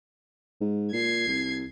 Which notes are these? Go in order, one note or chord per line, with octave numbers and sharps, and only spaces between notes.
G#2
A#2 G#6 C7
C2